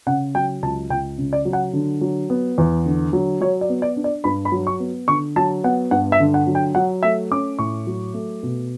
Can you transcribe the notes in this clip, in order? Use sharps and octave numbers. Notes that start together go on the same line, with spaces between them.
C#3 F#5
F#3 G5
C#2 A5
C#2 G5
C#3
D5
F#3
F#5
D3
F#3
B3
E2
D3
F#3
F#3 C#5
D5
B3
D5
D4
D5
G2 B5
B5
F#3
C#6
B3
D3 C#6
F#3 A5
B3 F#5
G2 F#5
E5
D3
F#5
F#3
G5
F#3 F#5
A3 E5
C#4 D6
A2 C#6
F#3
A3
B2